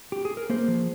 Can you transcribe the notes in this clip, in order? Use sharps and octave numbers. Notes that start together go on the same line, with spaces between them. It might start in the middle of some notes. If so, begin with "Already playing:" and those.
G4
G#4
A#4
A#3 G#4 C5
F3